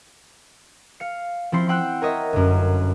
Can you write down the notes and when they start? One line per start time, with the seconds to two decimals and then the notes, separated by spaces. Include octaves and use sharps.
1.00 F5 C#7
1.52 F3 C4 E4 C6 C#7
1.69 F#5 G5 C6 E6 F#6
2.02 A#4 C#5 D#5 E5
2.33 G1 F#2